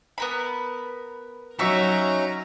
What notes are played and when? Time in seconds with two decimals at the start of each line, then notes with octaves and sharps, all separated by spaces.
0.18 B3 A#4 B5
1.59 F#3 C#4 D#4 E5 A#5 C#6 E6